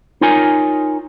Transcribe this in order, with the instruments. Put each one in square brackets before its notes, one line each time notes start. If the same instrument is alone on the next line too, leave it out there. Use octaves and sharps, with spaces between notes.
[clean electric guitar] D#4 F4 A#4 C#5 G#5